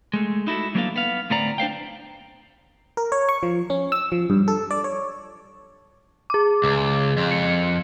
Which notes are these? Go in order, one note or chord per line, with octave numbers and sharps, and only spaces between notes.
G#3 A3
D#4 E4 F#4 A4
F#3 A#3 B3 D4 A4 F5
B3 F5
D2 A2 B3 C4 D5 A#5
D4 C5 F5 G5
A#4
C#5
C#6
F3
C#4
E6
F3
G2
A4
D5
C#5
G#4 D6
C#2
F2
C#7